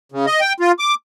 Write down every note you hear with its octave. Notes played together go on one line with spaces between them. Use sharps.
C#3
D#5
G5
F4
D6